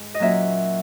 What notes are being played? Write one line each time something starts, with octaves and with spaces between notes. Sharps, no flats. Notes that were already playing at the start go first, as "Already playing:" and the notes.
Already playing: G#2
D#5
A#2 F#3 A#3 C#4 E5